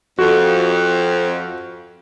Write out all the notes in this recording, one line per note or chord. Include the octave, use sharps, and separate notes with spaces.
F2 F#4